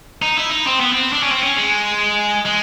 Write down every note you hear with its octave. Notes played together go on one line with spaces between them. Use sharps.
D#4
E4
D#4
C4
B3
C4
D4
C#4
C4
C#4
G#3
G#3